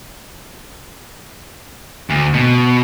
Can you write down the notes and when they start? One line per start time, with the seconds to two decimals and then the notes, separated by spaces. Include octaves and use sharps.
2.10 D2
2.34 B2